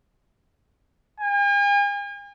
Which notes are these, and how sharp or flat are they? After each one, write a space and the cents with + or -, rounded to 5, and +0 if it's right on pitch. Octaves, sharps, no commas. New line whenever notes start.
G#5 -45